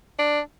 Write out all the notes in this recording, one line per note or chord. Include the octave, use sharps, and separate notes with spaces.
D4